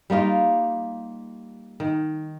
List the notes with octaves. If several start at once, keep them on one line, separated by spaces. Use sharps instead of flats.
G3 A#3 D#4 F4
D#3